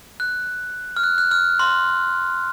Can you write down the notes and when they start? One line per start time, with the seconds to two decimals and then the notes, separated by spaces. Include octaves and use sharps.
0.20 F#6
0.97 F6
1.04 F#6
1.18 F#6
1.31 F6
1.59 C6